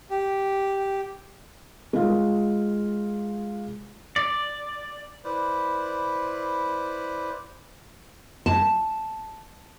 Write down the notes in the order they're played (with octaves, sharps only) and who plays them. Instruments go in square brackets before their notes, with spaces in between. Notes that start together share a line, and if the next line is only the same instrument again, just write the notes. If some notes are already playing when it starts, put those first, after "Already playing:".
[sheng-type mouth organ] G4
[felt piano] G#3 F4
[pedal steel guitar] D5
[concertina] E4 B4 C5 D5
[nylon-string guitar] A5